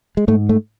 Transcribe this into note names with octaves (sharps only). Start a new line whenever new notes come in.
G#3
G#2 A3
A3